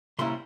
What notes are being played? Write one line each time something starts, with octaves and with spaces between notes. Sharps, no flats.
C3 G3 A#3 C#4 E4 C6